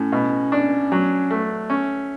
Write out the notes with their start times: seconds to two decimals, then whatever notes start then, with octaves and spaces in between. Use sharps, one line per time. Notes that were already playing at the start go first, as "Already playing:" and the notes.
Already playing: A2 C#4
0.12 B2
0.52 D4
0.92 F#3
1.30 A3
1.70 C#4